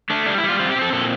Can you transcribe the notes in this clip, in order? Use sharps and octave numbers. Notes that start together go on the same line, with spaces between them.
A3 D4
G3 D4
E4
G3
F4
C4 F4
G4
C4
A4
A#2 A4